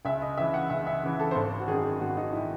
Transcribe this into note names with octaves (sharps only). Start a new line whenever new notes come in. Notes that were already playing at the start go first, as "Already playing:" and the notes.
C#2 E5
D#5
C#3 E3 E5
F#5
C#2 E5
E5
C#3 E3
A4
C5
G#1 A4
F#4
F#2 D#3 G#4
G#1 F#4
D#4
E4
D#3